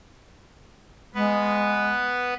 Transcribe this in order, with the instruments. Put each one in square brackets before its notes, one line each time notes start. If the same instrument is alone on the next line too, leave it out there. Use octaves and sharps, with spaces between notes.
[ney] G#3 [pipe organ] B3 B4